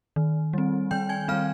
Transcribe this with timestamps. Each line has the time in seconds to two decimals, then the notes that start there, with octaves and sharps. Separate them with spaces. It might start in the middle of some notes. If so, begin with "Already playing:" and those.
0.16 D#3
0.53 G3 C4
0.91 D#3 G5 G6
1.09 G#5 G#6
1.28 G3 C4 F5 F6